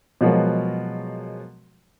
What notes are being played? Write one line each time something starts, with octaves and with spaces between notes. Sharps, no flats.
B2 F3 F#3 G#3 F#4 A#4